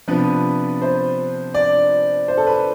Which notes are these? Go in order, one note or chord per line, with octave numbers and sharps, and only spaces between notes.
C3 F3 B3 D4 B4
C5
D5
C5
A4
B4